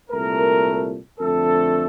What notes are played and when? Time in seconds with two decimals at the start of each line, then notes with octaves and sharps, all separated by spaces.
0.10 C2 A#2 A3 A#4
1.19 F2 D3 A3 A4